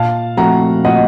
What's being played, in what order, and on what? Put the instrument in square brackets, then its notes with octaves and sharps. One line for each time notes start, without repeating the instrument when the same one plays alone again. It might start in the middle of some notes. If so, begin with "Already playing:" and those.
Already playing: [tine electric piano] A#2 [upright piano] F5 A5
[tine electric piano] F3 A3 C4 F#4 [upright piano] F#5 A#5
[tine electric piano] A#2 [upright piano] D#5 F#5